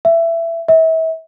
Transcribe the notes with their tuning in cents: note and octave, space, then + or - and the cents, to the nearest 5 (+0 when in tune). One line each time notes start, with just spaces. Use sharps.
E5 +20
E5 -35